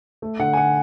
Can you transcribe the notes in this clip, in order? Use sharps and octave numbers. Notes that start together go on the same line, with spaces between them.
A3
D3 F#5
G#5
D3 F#5